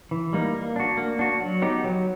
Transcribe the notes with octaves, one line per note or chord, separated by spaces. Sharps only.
E3
G3 A#3 D#4
A#3
D4 F#4
A#3
D4 F#4
F#3
B3 D#4 G4
F#3